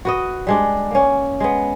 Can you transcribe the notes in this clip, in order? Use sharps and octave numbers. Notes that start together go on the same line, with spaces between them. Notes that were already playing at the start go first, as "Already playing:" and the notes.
F#4 B4 D#5
G3 G#3 D4
A#3 C#4
G#3 B3